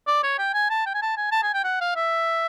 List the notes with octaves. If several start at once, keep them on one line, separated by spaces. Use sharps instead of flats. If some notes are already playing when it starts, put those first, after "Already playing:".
D5
C#5
G5
G#5
A5
G5
G#5
A5
G#5
A5
G#5
G5
F#5
F5
E5